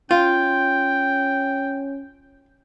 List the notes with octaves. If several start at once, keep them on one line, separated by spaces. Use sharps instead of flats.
C#4 F4 G5